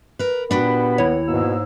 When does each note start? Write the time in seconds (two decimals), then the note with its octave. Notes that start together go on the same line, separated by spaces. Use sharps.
0.19 A#4 B4
0.51 A#2 B3 D4 F#4 G4 B5
0.98 D#2 E4 C#5
1.28 G#2 B2 A#3 E6